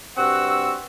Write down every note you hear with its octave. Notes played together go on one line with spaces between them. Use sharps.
G2 C4 F#4 F#5 E6